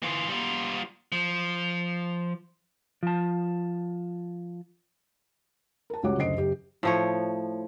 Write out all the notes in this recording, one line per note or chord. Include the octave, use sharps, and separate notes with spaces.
E3 F4
G3 F4
F3
F3 A5
A#4 A5
C#2 G3 F#4 C#5 F#5 D6
F#1 D2 C5 D#5 C7 D7
F#1 G4
A2 F3 C#5